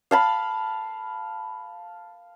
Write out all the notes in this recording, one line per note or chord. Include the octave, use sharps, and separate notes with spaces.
F5 A5 B5